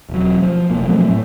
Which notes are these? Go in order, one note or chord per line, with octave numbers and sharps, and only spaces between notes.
E1 F#3
F3
F1 B1 B2 A#3
F3 F#3 A3 C4
A2